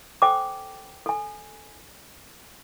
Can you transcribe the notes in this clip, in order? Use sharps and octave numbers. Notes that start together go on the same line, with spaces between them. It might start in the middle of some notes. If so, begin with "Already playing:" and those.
A4 C5 G5 G#5 D6
A4 G#5